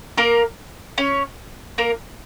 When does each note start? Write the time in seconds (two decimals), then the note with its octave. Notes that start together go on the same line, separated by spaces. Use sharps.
0.17 A#3 A#4
0.98 C#4 C#5
1.78 A#3 A#4